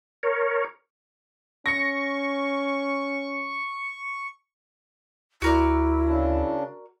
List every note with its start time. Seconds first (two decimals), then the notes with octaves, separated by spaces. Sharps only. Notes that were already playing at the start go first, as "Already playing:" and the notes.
0.23 A#4 C#5
1.66 C#4 C#6 A#6 C#7
5.42 D2 E4 F#4 A#4 D5
6.05 C#3 D4